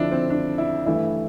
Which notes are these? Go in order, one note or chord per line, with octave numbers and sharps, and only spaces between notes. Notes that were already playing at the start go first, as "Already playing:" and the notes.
Already playing: F2 D3 F3 D4 E4
C4
D4
E4
G2 E3 A3 E4